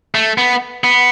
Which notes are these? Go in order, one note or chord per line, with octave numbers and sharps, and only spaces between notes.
A3
B3
B3